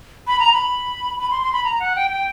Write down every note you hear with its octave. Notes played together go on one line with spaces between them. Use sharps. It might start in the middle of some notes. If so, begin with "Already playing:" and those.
B5
A#5
B5
B5
C6
C6
B5
A#5
F#5
G5
G5